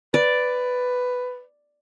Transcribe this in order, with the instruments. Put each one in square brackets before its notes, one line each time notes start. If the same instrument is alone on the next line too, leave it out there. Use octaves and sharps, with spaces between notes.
[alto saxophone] B4 [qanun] D5